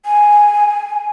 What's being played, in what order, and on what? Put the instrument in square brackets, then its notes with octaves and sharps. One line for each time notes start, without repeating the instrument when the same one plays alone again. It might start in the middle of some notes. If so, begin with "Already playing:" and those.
[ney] G#5